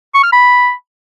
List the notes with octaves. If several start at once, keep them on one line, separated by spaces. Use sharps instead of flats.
C#6
F6
B5